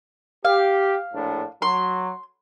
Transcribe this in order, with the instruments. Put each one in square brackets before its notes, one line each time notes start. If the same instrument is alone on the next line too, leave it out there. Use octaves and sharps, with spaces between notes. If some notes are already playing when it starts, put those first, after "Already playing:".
[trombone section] G4 [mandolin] F5
[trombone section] A#1 A2 D4
[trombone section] F#3 [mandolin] C6